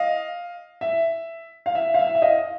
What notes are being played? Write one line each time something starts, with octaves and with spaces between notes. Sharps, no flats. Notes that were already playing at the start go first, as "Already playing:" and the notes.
Already playing: D#5 F5
E5
F5
E5
F5
E5
E5
D#5 F5